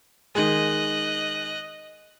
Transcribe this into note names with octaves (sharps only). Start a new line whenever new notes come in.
D#3 G#3 D#5 F#6